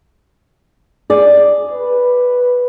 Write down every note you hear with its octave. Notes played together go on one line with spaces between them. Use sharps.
G#4 D5
B4